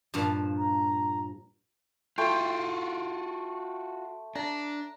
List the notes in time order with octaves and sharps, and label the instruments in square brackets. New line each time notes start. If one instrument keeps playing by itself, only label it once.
[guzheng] G2 A#2 F3
[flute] A#5
[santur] A3 G5 C6 [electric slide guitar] F4 F#4
[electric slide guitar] D4 [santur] A#5